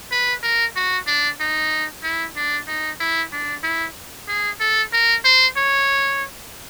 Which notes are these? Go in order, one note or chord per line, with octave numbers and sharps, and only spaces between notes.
B4
A#4
F#4
D4
D#4
E4
D4
D#4
E4
D4
E4
G#4
A4
A#4
C5
C#5